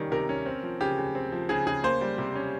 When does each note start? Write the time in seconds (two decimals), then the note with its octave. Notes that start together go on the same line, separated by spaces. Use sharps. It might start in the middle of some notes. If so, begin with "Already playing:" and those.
Already playing: C3 D#3 G3 C#4
0.12 C3 A#4
0.29 C#4
0.46 C4
0.63 F3
0.81 C#3 G4
0.98 C#3
1.15 C4
1.32 F3
1.49 C#3 G#4
1.67 C#3 G#4
1.84 A#3 C5
2.01 G3
2.18 C3
2.35 C#4